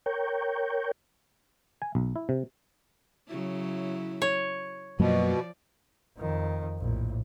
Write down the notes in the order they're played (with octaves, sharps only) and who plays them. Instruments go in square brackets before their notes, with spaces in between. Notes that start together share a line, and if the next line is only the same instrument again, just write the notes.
[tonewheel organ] A#4 C#5 G5
[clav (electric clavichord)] G#5
B1
E4
C3
[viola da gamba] C#3 F#3 E4
[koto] C#5
[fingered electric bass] F#2 F#3 A#3 [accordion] B2 [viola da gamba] F3 D5
[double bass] F2 D#3
A#1 A2